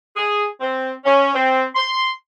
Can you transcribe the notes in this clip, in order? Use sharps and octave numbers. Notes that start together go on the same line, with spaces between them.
G#4
C4
C#4
C4
C6